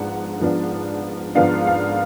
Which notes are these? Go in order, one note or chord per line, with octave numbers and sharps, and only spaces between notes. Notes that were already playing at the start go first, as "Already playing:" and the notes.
Already playing: G#2 F3 B3 D4 F#5
G#2 F3 B3 D4
G#2 F3 B3 D4 F5
F5